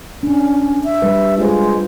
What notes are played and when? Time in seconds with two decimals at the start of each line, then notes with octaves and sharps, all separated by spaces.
0.23 C#4 D4
0.84 E5
1.02 G3 B4
1.38 G#3 F4 C5